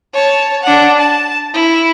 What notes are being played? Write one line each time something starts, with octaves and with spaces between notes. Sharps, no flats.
C#5 A5
D4 F#5
A5
E4